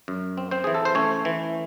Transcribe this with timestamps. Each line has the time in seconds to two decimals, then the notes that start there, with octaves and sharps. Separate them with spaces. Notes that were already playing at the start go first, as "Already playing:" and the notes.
0.08 F#2
0.38 C4
0.51 C4 C5
0.64 E3 G#4
0.74 A4
0.85 C5
0.95 A3 C#4 C#5
1.25 E3